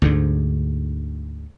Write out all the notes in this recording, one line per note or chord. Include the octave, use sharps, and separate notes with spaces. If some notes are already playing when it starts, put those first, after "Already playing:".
D2 G#2 D3